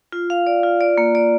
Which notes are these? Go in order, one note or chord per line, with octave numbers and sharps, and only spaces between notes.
F4
F5
D5
F4
D5
A#3
D5